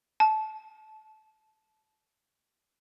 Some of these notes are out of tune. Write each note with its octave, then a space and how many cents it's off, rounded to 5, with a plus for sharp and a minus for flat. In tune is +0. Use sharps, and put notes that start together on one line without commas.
A5 -20